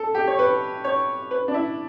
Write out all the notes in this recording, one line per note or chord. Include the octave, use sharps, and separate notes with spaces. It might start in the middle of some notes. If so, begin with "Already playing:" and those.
Already playing: A4
G4
C#5
B4
C#5
B4
D4
E4